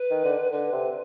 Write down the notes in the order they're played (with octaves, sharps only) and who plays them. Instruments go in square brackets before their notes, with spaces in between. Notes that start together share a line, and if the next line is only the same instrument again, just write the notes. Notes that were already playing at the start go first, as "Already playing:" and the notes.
Already playing: [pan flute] B4
[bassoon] D#3
D3
[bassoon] D3 [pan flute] B4
[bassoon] C3